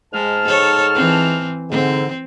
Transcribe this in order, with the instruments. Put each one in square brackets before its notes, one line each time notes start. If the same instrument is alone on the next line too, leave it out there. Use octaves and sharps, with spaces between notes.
[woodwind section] G#2 A5 F6 [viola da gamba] G#3
[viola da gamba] A4 C#5
E3 C4
[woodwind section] G#2 D3 [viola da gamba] C4